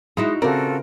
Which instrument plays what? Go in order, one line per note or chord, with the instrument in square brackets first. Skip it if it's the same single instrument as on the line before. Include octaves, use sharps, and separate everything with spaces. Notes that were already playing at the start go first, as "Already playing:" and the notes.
[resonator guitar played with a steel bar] G#3 [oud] D#4 E4 F#4
[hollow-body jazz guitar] C#3 C4 [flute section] F4 F#4 A4 [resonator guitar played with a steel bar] A#4 [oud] D5